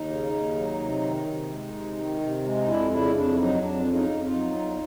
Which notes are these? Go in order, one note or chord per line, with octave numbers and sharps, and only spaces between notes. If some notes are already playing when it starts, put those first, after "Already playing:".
Already playing: D#2 D#4
C#3
D#2
F#3
C3
D#3
C3
G#3
C3
D#3
C3
G#3
D#4
F2 D4 E4
C#3 D4 E4
F2 D4
E4
F#3 D#4
F2 D4
C#3
D#4
F2
D#4 F4
F#3
E2